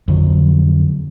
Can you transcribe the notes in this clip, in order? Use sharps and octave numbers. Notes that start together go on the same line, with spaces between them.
F2 D3 F#3